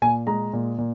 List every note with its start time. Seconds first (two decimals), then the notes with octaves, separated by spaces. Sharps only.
0.02 A#2 G#5
0.27 G#3 A#5
0.53 A#2
0.78 A#2